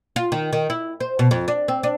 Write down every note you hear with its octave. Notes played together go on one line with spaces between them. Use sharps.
F4
D#3
D#3
E4
C5
B2
F2
D4
C4
D4